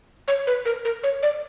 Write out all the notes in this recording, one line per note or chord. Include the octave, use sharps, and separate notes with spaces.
C#5
B4
A#4
A#4
C#5
D5